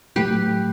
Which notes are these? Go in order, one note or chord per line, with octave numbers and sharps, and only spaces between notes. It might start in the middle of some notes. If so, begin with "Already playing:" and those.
A2 F#3 A3 G4 B4